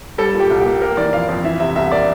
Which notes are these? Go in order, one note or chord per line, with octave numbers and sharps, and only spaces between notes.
G3 A4
A#2
G4
C2
A#3 G4
A#3 A#4
E3 D5
F2 F5
F2
E3 E5
C3 E5
C2 E5
A#3 D5